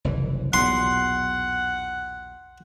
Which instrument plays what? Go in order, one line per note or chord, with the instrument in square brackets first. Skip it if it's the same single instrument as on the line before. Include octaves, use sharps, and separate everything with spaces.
[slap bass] F#1 C2 E3
[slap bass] B1 E2 A#2 [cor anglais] F#5 [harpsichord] C6